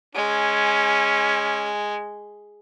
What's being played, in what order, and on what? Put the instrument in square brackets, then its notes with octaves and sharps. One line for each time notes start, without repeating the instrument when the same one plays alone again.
[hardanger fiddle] G#3 [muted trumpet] C#4